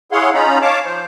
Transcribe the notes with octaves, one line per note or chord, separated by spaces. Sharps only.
E4 G#4 C#5 F5 F#5 C6
C#4 D#4 F4 A#5 B5
C#5 F5 A5 D6
F3 C5